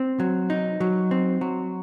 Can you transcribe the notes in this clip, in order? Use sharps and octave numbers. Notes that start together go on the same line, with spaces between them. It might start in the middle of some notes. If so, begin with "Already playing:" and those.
Already playing: C4
F#3
D#4
F#3
C4
F#3